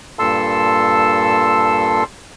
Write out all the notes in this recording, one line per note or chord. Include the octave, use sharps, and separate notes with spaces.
G2 A#2 A4 A5 C6 E6